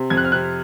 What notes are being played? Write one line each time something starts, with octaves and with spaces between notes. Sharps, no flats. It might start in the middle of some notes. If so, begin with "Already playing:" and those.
Already playing: C3
F2 G#6
F#6
F6
C3 F#6